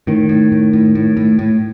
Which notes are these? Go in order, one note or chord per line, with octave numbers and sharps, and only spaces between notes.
A2 D#3
A2
A2
A2
A2
A2
A2